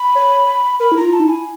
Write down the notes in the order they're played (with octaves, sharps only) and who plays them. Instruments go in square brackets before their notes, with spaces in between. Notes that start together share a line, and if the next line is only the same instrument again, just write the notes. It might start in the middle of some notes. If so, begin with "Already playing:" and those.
Already playing: [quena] B5
[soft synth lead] C#5
[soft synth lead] A#4 [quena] B5
[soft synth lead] E4
[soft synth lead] F4 [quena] A#5
[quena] A5
[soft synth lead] D#4
E4
[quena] G#5